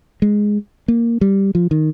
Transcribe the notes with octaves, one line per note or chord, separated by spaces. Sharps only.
G#3
A#3
G3
F3
D#3